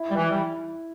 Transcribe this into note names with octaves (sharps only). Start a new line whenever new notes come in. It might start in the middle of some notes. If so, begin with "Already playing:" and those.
Already playing: E4
G3
E3 E4
G3